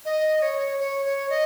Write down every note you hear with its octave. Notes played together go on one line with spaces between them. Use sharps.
D#5
C#5
C#5
C#5
D#5